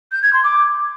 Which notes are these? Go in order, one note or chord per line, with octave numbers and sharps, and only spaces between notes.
G6
G#6
C6
D6